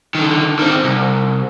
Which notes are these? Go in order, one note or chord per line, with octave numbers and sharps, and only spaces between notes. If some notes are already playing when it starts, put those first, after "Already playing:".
D3 D#3
D#3 C4
C2